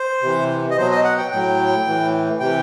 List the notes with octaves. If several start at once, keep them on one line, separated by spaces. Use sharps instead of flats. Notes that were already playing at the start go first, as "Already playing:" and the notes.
Already playing: C5
C3 E3
D#5
B2 F#3 C5
D#5
F#5
G5
A2 F#3 G5
A2 E3
C3 E3 G5